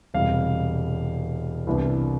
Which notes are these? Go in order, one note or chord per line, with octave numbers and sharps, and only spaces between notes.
E1 E2 C3 G3 F5
C2 C3 E3 B3 D4